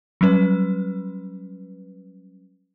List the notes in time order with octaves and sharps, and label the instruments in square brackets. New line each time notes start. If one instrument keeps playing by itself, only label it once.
[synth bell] F#3 G3 C#4 B4